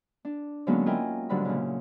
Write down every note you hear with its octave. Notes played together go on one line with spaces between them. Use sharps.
D4
D3 F#3 G#3 A#3 B3 C#4
E4 F4 A#4 D#5 G5 G#5
G#2 D3 F#3 G3 B5
A#2 C#3